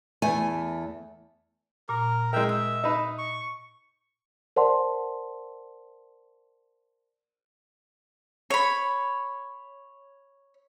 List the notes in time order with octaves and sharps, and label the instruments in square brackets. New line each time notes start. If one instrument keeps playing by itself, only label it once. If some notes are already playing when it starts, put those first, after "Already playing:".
[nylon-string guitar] E2 A3 G#5
[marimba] A#2 [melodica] A#4
[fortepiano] G#3 A#4 [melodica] E5 G5
[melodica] E5 [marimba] E6
[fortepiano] D#4 B4
[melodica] C#6
[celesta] A#4 C5 D5 F#5 A5 C6
[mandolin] C#5 B5